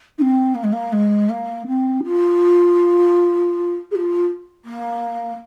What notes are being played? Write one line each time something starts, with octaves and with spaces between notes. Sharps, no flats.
D#4
C4
A#3
G#3
A#3
G#3
A#3
C4
F4
G#4
F4
A#3